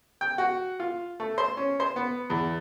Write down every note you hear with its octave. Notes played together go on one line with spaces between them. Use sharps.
G5
F#4
F4
A3
C5
C#4
C5
B3
E2